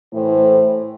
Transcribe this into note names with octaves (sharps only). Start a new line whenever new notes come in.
A2 E3 A3 E4 C5